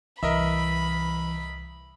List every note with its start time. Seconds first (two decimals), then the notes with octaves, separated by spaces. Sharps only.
0.23 C2 E3 A#4 D#5 E5 B5